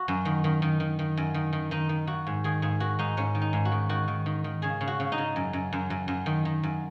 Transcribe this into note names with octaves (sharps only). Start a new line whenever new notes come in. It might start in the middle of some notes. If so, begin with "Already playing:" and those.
Already playing: F#4
F#2
D#3
D#3
D#3
D#3
D#3
F#2
D#3
D#3
D#3 D#4
D#3
D#3 F#4
G#2
D#3 G#4
G#2 G#4
D#3 F#4
G#2 D#4
G#2 C#4
D#3
D#4
G#2
F#4
D#3
D#3 F#4
D#3
D#3
D#3
C#3 G#4
C#3
F#4
C#3
D#4
C#3
F#2
F#2
F#2
F#2
F#2
D#3
D#3
F#2